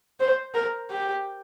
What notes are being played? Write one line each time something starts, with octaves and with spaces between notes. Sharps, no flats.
C5
A#4
G4